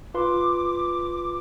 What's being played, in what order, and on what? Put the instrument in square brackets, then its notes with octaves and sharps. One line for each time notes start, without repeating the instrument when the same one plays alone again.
[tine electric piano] F4 B4 C6 [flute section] D6